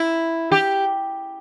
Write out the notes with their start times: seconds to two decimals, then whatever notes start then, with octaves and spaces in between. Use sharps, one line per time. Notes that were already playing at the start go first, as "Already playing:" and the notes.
Already playing: E4
0.52 G4